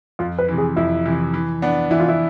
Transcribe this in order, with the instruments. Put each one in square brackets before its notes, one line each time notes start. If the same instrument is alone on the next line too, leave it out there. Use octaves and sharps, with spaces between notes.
[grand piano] F2 [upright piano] F4
[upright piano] B4
[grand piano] C3 E3
[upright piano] G#4
[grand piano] F2 [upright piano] E4
[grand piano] C3 E3
E3
B3 D4
[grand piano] E3 [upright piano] E4
[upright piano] F4
E4